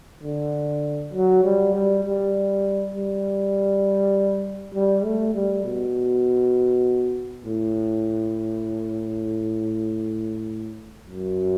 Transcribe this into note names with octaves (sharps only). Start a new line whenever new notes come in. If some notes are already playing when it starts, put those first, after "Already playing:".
D3
F#3
G3
G3
G3
G3
G3
A3
G3
B2
A2
F#2